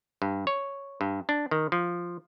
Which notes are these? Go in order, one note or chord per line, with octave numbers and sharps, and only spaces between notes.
G2
C#5
G2
D4
D#3
F3